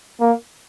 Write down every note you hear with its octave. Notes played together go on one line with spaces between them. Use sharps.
A#3